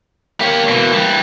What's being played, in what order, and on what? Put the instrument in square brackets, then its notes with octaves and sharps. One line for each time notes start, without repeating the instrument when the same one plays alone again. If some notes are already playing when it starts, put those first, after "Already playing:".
[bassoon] A#3 [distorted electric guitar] G4 C#5
[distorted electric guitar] B2 E3
E3 G3